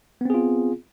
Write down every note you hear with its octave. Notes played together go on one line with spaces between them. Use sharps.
B3 C4 F4 G#4